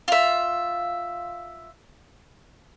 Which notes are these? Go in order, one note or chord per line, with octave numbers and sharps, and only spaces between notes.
F4 E5